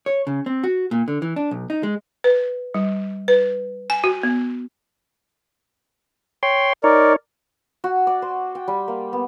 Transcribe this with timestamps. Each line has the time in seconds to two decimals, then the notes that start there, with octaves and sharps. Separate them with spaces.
0.06 C#5
0.27 C#3
0.46 C4
0.64 F#4
0.91 A#2
1.08 D3
1.22 E3
1.36 D4
1.51 B1
1.70 D#4
1.83 G#3
2.24 B4
2.74 G3
3.28 B4
3.90 G#5
4.04 F#4
4.23 B3
6.43 C#5 G5 C6
6.84 D#4 A#4 C#5 D5
7.84 F#4
8.07 D5
8.22 C5
8.55 G5
8.68 G3
8.88 A#3
9.13 B3